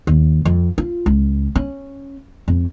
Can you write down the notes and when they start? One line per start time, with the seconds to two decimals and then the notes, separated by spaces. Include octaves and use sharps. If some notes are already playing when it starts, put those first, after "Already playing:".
0.07 D#2
0.45 F2
0.78 F4
1.06 C#2
1.55 C#4
2.48 F2